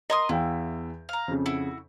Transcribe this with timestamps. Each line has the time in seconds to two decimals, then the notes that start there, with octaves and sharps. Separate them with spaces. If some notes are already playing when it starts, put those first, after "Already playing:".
0.10 A#4 D#5 C6 D#6
0.29 E2 E4 F5 G5
1.09 F5 A#5
1.28 F2 C#3
1.46 E4 F#4